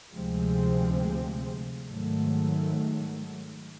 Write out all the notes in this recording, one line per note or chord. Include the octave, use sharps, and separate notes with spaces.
D2 C3 F3 G#3 C4
G#2 D#3 F#3 A3